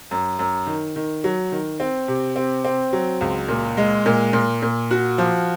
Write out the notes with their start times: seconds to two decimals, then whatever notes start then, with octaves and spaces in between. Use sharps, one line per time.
0.11 F#2
0.39 F#2
0.67 D#3
0.96 D#3
1.24 F#3
1.52 D#3
1.80 C4
2.08 C3
2.36 C4
2.65 C4
2.93 F#3
3.21 C#2
3.48 A#2
3.77 G#3
4.06 A#2
4.33 A#2
4.62 A#2
4.91 F#4
5.18 F3